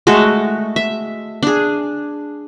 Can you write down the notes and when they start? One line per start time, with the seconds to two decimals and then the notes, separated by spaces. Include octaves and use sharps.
0.07 G#3 A3 F#4 A4
0.76 E5
1.43 D4 G#4